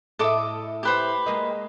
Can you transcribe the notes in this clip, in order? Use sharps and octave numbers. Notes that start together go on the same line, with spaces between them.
A2 A4 D#5 E5 D6
G4 B4 C5
G#3 A#3 D#5